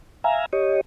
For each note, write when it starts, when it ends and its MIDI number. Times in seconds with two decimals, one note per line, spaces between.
0.24 0.46 76
0.24 0.46 77
0.24 0.46 80
0.24 0.46 82
0.53 0.81 67
0.53 0.81 73
0.53 0.81 75